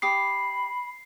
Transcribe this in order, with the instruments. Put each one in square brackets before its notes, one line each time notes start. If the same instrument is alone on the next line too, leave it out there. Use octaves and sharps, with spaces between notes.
[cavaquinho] G4 D6 D#6 [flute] B5 [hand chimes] C7